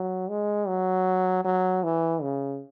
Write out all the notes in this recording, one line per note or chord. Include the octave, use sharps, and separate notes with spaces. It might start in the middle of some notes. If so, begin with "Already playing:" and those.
Already playing: F#3
G#3
F#3
F#3
E3
C#3